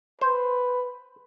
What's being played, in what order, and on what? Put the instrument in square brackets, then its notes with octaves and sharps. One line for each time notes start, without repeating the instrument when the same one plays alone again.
[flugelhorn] B4 [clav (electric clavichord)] C5